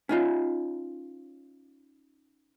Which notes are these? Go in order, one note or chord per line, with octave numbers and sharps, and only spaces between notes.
C#4 D#4 F4